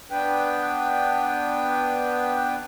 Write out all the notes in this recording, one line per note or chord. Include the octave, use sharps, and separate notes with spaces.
B3 D4 B4 G5